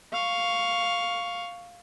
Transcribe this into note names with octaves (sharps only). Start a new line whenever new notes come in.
F5 C#6